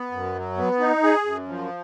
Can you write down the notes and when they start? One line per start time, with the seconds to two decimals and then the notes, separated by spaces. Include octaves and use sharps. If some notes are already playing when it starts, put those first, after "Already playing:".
Already playing: B3
0.12 F#2
0.34 F#3
0.57 B3
0.80 D#4
1.03 G#4
1.26 F#2
1.48 F3